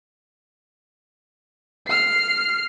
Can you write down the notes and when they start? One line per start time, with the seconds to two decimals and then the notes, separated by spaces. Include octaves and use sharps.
1.88 F6 C7